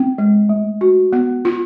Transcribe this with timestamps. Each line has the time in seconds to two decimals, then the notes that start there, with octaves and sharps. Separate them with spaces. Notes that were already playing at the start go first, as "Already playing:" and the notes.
Already playing: C4
0.18 G#3
0.49 A3
0.81 F#4
1.13 B3
1.45 F4